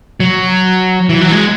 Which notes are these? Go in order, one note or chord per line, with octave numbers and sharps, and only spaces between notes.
F#3
E3
F#3
G#3